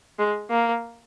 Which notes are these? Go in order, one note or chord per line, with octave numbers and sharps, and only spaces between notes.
G#3
A#3